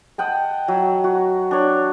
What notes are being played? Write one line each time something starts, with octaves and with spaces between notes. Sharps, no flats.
D#5 F#5 G5 A5
F#3
F#4
D4 C#5